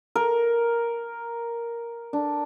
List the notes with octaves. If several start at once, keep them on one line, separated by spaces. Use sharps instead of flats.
A#4
D4